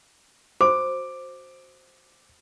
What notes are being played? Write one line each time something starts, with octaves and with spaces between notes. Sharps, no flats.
F#4 C5 D6